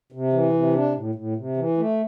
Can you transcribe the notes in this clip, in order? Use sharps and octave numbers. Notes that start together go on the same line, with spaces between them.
C3
E3
C3
D4
A2
A2
C3
E3
A3